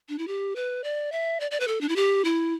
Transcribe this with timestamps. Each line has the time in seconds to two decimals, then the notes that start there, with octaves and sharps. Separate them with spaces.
0.09 D4
0.18 E4
0.27 G4
0.56 B4
0.84 D5
1.12 E5
1.40 D5
1.51 D5
1.60 B4
1.68 A4
1.81 D4
1.89 E4
1.96 G4
2.25 E4